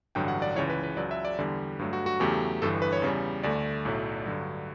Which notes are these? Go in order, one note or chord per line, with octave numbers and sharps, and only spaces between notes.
A1 G2 D3 F#3 G5
F#5
D5
C#2 C#3 E3 C#5
B4
B4
C#2 C#3 F#3 D5
E5
D5
E2 D3 G3
G2 F#3 A3
F#4
F#4
E2 C#3 F#3 A3 G4
G1 G2 E3 A4
B4
C#5
E2 C#3 G3
D2 D3 A3 D5
B1 A2 F#3 A3
G2 D3 F#3